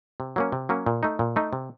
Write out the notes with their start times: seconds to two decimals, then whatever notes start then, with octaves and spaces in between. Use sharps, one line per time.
0.20 C3
0.36 F#3 A#3 C#4
0.52 C3
0.69 F#3 A#3 C#4
0.86 A#2
1.03 A3 D#4
1.19 A#2
1.36 A3 D#4
1.53 C3